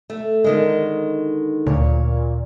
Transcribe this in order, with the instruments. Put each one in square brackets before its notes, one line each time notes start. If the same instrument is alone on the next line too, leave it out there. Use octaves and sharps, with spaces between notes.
[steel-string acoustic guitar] A3
D3 D#3 G#3
[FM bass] D2 [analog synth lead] A#2 [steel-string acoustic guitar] C#5